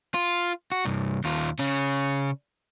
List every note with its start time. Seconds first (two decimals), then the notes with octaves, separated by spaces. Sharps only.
0.14 F4
0.72 F#4
0.85 C2 G2
1.24 D#2 F4
1.59 C#3 C#4